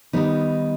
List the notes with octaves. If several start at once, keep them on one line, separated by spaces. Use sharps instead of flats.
D#3 G3 B3 D#4